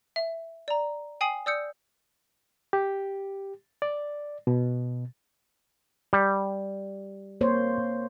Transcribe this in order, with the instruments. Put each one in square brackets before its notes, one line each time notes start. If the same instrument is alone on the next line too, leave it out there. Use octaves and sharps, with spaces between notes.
[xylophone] E5
D5 A#5
G5 G#5 D#6 C7 F#7
D5 D#6 E6 G6 C#7
[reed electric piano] G4
D5
B2
[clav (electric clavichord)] G3
[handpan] A#3 C5 C#5